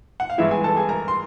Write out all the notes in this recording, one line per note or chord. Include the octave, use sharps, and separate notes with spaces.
F#5
F5
G2 E3 G#3 B3 E4 E5
G#4 G#5
A4 A5
G#4 G#5
A#4 A#5
C6